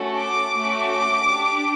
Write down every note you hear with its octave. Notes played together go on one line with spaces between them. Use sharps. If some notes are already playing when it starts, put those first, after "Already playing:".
Already playing: A3 C#4 F#4 A4
D6
A3 C#4 F#4
D6
D4 G4